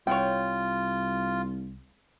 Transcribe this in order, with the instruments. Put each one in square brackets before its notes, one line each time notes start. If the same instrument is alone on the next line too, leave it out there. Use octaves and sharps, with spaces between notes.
[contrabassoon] C2 [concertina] F4 [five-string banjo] C#5 F#5 G5